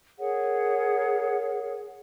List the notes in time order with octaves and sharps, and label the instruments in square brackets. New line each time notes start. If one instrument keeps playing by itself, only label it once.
[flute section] G#4 A#4 C#5 F#5